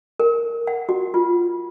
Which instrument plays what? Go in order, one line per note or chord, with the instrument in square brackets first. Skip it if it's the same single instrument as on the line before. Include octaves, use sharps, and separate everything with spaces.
[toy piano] A#4
F#5
F#4
F4